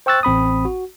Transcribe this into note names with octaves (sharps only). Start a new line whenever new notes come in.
C5 G5 C#6 E6 F#6 A6
A1 C4 B5 D#6
F#4